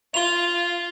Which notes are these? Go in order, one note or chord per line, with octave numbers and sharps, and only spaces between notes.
F4 F7 G7